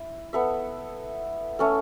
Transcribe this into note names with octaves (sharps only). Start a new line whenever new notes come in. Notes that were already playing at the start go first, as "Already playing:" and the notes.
Already playing: E4
B3 A4 E5
A3 C#4 A4